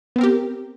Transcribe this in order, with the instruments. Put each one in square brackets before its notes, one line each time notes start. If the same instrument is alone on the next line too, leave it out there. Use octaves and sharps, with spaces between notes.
[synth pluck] B3
C4
A#4
G4